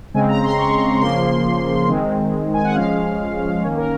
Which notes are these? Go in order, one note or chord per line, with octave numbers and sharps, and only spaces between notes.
C#3 G#3 C4 G#5
A#5
C6
C#6
C#3 F3 A#3 C6
D#3 G#3 C4
G#5
F#5
F3 G#3 C#4 F5
D#3 A#3 C#4 C#5
A#4